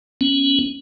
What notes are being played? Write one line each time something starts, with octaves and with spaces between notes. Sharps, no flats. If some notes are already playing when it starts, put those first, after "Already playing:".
B3 C#4